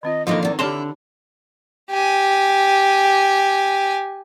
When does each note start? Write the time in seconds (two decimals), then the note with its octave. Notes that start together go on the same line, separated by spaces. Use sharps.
0.03 D#3 C4 F4 D#5
0.27 D3 E3 F3 A#3 D#4 F4 A4 D#5
0.43 D#3 E3 C4 D5 F#5
0.59 D3 D4 E4 G4 C#5 A5 C6
1.90 G4 G#5